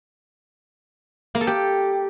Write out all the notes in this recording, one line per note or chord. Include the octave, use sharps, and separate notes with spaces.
A#3
A4
G4